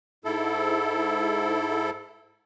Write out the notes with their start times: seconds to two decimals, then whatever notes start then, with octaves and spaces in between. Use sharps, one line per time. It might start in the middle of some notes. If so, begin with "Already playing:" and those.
0.25 G#2 E4 A4